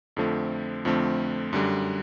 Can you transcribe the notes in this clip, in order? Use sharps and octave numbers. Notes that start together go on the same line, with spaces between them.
F2 D3 F3 A3 C4
F2 D3 F3 A3 C4
F#2 D3 G3